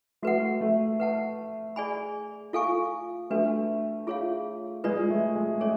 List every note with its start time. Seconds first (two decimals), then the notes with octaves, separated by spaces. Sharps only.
0.22 A3 F#4 B4 F#5
0.61 A3
1.00 B4 F#5 A5
1.76 G#4 D5 G#5 B5
2.53 F4 A4 F5 G#5 C#6
3.30 A3 D4 F#4 B4
4.07 F4 G#4 C#5 F5
4.84 G#3 F4 B4 D5
5.10 A3
5.35 G#3
5.61 A3 C#4 G#4 C#5